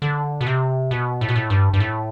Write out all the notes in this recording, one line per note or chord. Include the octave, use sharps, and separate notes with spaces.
D3
B2
C3
B2
A2
B2
A2
G2
G2
A2